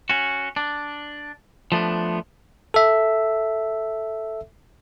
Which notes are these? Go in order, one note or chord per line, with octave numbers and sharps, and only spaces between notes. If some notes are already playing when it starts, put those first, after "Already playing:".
C#4 F#4
D4
F3 A3 B3 D4
A4 E5